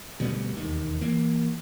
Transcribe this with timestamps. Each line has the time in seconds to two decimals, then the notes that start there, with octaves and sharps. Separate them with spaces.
0.20 D2 B2 G3 B3
0.56 E1 D#2 D#3
1.01 E3 A#3